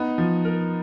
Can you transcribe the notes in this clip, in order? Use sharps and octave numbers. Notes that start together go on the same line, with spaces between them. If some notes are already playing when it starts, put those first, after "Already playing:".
Already playing: B3 D#4
F3
A#4